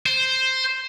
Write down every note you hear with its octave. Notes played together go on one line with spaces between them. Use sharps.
C5